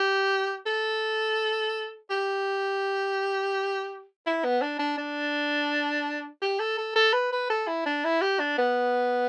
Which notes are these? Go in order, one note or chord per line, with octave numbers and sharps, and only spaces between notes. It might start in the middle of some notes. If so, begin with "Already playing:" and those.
Already playing: G4
A4
G4
E4
B3
D4
D4
D4
G4
A4
A4
A4
B4
B4
A4
E4
D4
E4
G4
D4
B3